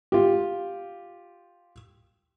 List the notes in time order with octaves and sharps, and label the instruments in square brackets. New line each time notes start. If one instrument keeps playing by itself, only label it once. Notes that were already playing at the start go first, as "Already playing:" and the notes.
[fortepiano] F4 G4